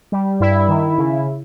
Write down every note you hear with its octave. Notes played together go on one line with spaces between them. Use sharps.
G3
G2 E4
D#3
C#3